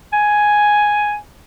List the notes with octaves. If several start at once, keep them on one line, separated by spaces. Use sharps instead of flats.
G#5